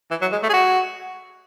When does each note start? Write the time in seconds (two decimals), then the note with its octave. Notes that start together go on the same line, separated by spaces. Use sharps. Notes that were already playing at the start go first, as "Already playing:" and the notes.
0.11 E3
0.21 F#3
0.32 G#3
0.43 A3
0.49 G#4
0.53 F#4